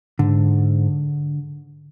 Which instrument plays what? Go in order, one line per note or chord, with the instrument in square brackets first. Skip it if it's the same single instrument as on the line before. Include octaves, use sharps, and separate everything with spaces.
[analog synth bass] G#2 [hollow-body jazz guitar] D3